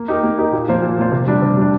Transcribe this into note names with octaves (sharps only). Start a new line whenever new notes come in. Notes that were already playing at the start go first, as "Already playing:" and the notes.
Already playing: A#3
D#4 G4 A#4
A#3
D#4 G4 A#4
A#2
F3 A#3 F4 C5
A#2
F3 A#3 F4 C5
C3
G3 D4
C3
G3 D4